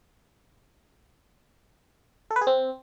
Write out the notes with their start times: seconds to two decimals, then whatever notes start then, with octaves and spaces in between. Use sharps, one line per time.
2.31 A4
2.36 B4
2.41 G#4
2.47 C4